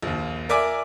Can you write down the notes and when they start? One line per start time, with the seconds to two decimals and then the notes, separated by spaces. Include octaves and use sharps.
0.02 A#1 D#2
0.49 A#4 D5 E5 G#5 D6